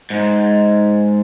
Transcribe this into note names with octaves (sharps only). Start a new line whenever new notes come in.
G#2